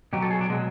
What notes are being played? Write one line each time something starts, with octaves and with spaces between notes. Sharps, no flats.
B2 F#3 G4
A4
G#4
D4
B2 F#3 G#3